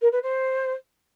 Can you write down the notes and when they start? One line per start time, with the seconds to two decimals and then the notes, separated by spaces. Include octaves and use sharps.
0.01 A#4
0.12 B4
0.22 C5